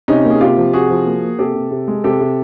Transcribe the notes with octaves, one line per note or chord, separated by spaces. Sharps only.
C3 C#4 D#4
A#3
G#4
C3 F4 G4
F3
C3 F#4 G#4
F3
A#3
A#3
C3 G4 A4
C3
C3
G#3
C3 G4 A4
C3